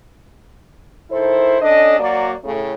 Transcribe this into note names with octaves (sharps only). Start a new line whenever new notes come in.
D#3 E4 A4 C5
C#4 D4 A4 D#5
F#3 A#3 F#4 D5
A2 C#3 A3